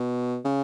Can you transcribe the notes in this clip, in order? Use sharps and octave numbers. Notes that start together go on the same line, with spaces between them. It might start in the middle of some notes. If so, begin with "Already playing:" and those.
Already playing: B2
C#3